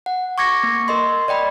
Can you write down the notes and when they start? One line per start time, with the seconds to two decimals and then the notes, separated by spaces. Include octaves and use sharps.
0.06 F#5
0.38 C#6 D6 G#6 A#6 C#7
0.63 A#3
0.88 A#4 D#5 C6
1.28 D5 D#5 G5 B5